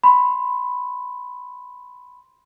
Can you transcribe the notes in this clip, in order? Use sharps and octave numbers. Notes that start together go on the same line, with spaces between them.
B5 C6